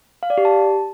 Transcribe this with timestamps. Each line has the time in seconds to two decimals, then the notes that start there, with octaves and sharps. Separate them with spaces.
0.23 F5
0.30 D5
0.38 G4
0.45 A5